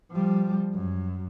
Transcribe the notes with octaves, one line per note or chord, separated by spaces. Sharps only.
F3 G3
F#2